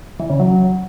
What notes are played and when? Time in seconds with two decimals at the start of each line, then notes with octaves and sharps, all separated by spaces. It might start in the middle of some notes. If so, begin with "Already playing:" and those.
0.20 E3
0.30 C#3
0.40 F#3